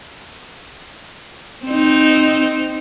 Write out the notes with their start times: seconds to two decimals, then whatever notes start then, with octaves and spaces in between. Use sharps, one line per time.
1.66 C4 D#4